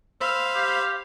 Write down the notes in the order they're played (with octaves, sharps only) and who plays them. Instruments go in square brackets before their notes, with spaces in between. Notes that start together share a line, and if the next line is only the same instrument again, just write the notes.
[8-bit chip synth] C5 B5 [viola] F5 [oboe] E6
[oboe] G4